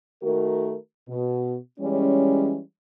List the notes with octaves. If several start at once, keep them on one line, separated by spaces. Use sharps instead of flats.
D#3 A3 F#4 A#4
B2
E3 G3 G#3 C#4